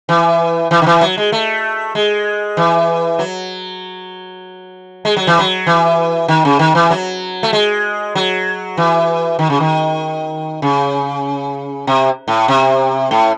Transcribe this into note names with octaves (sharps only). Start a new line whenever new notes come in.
E3
E3
D#3
E3
F#3
G#3
A3
G#3
E3
F#3
G#3
F#3
E3
F#3
E3
D#3
C#3
D#3
E3
F#3
A3
G#3
F#3
E3
D#3
C#3
D#3
C#3
C3
A2
C3
A2